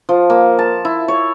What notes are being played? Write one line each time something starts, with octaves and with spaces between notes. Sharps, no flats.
F3
A#3
A5
E4
C#5